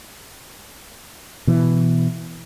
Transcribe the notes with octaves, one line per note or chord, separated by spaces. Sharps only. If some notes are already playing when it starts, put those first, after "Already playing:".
B2 E3